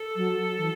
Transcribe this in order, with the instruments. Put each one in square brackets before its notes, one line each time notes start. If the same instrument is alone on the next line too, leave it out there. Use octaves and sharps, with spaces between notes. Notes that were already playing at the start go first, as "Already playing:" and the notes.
Already playing: [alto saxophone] A4
[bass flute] F#3
E3